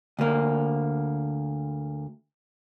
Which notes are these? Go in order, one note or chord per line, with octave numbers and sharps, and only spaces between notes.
D2 A#3